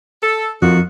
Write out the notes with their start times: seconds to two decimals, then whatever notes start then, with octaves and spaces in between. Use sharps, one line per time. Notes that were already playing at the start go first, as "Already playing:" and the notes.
0.23 A4
0.62 F2 D#3 F4 F#4